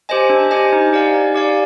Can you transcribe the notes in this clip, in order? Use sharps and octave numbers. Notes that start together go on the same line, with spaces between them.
G4 C5 D#5 G#5
D4
G4 C5 D#5 G#5
D#4
G4 D5 F5 G#5
D#4
G4 D5 F5 G#5